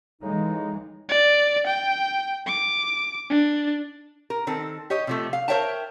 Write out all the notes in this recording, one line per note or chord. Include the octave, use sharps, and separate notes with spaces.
A2 C#3 E3 G#3 D#4
D5
G5
D6
D4
A#4
D#3 C4 A4
G4 C#5 D#5
C3 F3 A3
F5
A#4 C5 C#5 E5 G5 A5